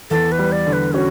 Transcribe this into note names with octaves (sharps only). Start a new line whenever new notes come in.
E2 A4
B4
G3
D5
D3
B4
C#4 F#4